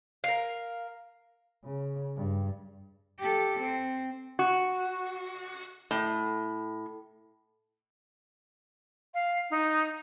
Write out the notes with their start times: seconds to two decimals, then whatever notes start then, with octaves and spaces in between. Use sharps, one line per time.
0.24 A#4 F5
1.64 C#3
2.17 G2
3.19 G4 A4
3.60 C4
4.39 F#4
5.91 A2
9.14 F5
9.51 D#4